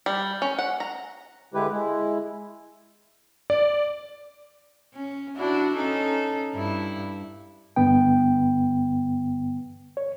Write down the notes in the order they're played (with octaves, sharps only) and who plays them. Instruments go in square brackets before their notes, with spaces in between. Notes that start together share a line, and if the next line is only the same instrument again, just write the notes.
[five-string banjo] G3
C#4
F#5
A#5
[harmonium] D3 G#3 E4 G4 B4
G#3 E4
[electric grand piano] D5
[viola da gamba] C#4
D4 E4 F#4
C#4 D#4 A4
G2 E4
[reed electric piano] G2 D3 B3 G5
C#5